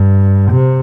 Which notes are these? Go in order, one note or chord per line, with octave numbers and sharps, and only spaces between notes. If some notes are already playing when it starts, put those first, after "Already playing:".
Already playing: G2
C3